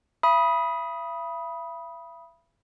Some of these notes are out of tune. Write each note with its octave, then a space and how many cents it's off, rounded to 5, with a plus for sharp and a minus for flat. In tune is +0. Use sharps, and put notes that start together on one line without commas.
E5 +40 B5 -15 D#6 +10